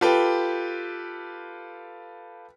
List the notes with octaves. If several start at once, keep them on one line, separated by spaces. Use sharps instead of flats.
F4 G4 A4 B4 G5